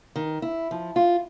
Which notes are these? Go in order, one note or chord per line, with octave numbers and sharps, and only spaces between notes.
D#3
E4
F3
F4